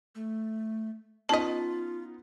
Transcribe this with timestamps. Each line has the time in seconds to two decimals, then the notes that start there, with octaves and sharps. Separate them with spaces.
0.15 A3
1.29 B3 C#4 D#4 F4 D#5 A5 B6